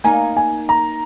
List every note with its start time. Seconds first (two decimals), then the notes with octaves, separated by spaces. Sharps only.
0.04 A#3 D#4 G#5
0.37 G#5
0.69 A#5